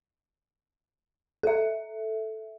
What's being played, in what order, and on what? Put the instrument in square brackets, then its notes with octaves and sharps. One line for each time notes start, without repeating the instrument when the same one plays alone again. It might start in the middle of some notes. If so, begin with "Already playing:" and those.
[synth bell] A4 E5